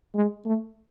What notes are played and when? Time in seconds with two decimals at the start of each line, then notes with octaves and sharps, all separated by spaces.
0.15 G#3
0.46 A3